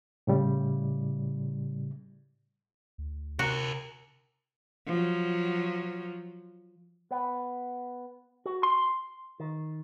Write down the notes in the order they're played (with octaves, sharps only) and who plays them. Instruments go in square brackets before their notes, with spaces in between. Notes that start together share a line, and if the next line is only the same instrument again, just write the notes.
[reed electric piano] A2 C#3 G3
[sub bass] D2
[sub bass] C3 [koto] F#4 [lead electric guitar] G4 A#4
[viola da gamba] F3 F#3
[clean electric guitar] B3
F#4
C6
D#3